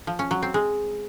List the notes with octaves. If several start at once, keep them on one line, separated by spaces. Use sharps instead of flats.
F3
C#4
F#3
C4
G#3